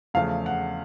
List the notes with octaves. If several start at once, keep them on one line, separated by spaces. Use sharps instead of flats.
E2 C#3 F3 A3 F5
F#5